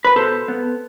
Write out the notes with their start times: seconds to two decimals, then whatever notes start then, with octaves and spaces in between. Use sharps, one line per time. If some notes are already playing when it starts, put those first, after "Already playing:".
0.05 B4
0.16 B2 A4 C5
0.48 B3